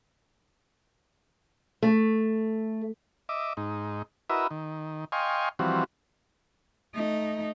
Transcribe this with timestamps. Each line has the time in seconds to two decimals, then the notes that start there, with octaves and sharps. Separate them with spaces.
1.82 A3
3.29 D#5 E5 D6
3.57 G#2 D#4
4.30 E4 F#4 A#4 B4 D#5 E5
4.51 D#3
5.12 D#5 F5 G5 G#5 C6 C#6
5.59 E3 F3 G3 C4 F#4
6.95 A3 D#4